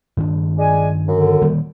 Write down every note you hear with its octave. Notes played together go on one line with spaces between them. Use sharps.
G2 D#3 D4
G#3 D5 G#5
F#2 D3
D#3 G3 A#3